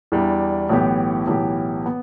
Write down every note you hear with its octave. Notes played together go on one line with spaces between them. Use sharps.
E2 E3 G3 D4
B1 A2 E3 B3 G4
B1 A2 E3 B3 G4
B3